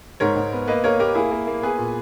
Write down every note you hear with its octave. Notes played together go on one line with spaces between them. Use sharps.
G#2 A#4 C#5
G#2
B3
A#3 B4 D#5
A#3 A#4 C#5
A#3 G4 A#4
A#3 E4 G#4
A#3
A#3
B3 G#4 B4
A#2